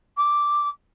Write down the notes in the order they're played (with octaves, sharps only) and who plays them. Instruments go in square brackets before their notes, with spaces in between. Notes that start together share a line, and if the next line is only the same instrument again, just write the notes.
[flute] D6